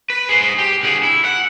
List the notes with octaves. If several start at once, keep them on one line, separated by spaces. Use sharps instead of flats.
B4
G#4 C5
G4
D3 G#4
E4
F#5